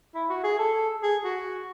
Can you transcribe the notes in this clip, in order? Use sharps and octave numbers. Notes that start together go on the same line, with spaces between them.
E4
F#4
G#4
A4
G#4
F#4